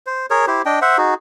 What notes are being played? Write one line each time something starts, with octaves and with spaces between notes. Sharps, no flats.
C5
G#4 A#4 C#5
E4 G4 C5
D4 D#5 G5
C5 E5 F#5
D#4 F#4 G#4